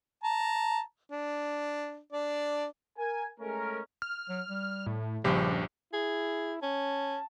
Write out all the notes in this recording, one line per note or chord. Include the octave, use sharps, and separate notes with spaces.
A5 A#5
D4
D4 D5
A#4 G#5
G#3 A3 C#4 A#4
F6
F#3
G3
A2
A#1 G2 C#3 F3 G4
E4 G#4
C#4 A5